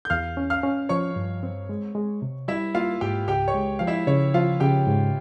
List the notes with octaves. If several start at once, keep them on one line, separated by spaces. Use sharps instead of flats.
G6
E2 F5 F6
C#4
F5 F6
C#4
F3 C#5 C#6
G2
C4
G#3
G#3
C3
G3 E4 E5
A#3 F4 F5
G#2 G4 G5
C#2 G4 G5
C#5 C#6
G#3
F3 F5
E4 E5
C#3 C#5
F3 F4 F5
C#3 G4 G5
G#2